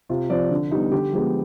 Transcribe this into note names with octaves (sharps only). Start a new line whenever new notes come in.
C3 F4
F3 C4 D5
D3
G3 B3 D#4
D3 G4
F3 G#3 B3